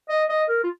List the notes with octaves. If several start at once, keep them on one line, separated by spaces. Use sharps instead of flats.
D#5
D#5
A#4
F4